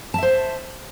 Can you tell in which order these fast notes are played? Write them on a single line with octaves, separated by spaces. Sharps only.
A5 E5 C5